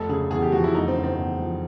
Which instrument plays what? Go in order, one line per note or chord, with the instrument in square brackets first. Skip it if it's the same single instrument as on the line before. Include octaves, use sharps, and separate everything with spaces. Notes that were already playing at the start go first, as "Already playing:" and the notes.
Already playing: [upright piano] F1 [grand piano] A4
[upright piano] C#3 [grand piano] G#4
[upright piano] E2 [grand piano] G#4
[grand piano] G4
[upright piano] F3 [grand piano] F#4
[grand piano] E4
[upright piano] F1 [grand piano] D#4
[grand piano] C4
[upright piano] C#3
[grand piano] C4
[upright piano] E2
F3